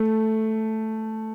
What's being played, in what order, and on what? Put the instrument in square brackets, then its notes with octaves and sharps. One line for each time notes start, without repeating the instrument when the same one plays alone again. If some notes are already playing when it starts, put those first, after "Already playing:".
Already playing: [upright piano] A3